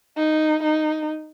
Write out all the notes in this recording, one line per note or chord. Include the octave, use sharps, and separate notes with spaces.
D#4
D#4